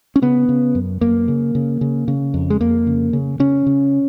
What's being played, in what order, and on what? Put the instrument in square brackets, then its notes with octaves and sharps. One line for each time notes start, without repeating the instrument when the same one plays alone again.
[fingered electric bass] C#4
C#3 B3
C#3
F#2
F#2 A#3
C#3
C#3
C#3
C#3
F2
G#3
F2 A#3
C#3
C#3
C#3 C#4
C#3